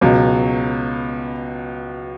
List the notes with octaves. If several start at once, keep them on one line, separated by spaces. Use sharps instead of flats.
C#2 B2 F#3